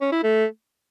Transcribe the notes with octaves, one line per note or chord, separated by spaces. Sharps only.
C#4
E4
A3